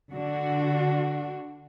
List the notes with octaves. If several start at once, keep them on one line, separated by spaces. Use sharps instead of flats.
D3 D4 F#4